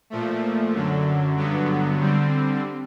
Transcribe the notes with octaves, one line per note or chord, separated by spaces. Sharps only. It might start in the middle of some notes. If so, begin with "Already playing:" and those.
A#2 F3 A3
F#2 D3 F#3
G2 D3 F#3 B3
D3 G3 C4